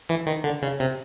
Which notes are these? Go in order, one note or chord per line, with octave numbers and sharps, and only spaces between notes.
E3
D#3
D3
C#3
C3